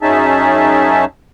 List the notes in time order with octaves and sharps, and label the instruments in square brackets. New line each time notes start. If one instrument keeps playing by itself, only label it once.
[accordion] F#2 C#4 D#4 G#4 E5 A5